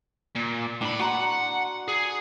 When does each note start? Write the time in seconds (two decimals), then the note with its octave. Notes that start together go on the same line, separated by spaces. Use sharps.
0.36 A#2
0.81 A2 D4 B5
0.99 F#4 F#5 A#5 C6
1.88 G#4